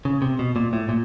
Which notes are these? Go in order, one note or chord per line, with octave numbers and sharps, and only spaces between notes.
C#3
C3
B2
A#2
A2
A#2